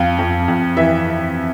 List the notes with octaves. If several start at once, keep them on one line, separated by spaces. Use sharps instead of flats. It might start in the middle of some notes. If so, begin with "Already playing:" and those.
Already playing: F2 F5
F2
F2
E3 E5